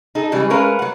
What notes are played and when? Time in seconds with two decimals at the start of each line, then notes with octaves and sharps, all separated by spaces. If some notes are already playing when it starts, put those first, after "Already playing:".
0.15 D#4 G#4 A4
0.32 C#3 E3 G3 G#3
0.50 G#3 A3 C#4 A#4 B4 F5
0.79 F#3 F#5